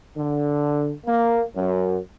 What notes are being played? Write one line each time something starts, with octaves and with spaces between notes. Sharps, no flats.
D3
A#3
F#2